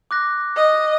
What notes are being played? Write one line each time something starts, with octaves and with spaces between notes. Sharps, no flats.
D6 F#6 A#6
D#5